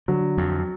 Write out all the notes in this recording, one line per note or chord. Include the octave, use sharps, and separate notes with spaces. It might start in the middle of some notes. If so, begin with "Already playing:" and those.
D3 F#3
F2